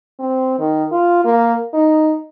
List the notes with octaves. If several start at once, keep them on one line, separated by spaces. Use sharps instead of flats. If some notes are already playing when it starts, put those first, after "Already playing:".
C4
D#3
F4
A#3
D#4